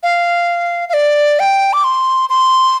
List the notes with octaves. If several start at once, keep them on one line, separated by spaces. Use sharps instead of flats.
F5
F5
D5
G5
D6
C6
C6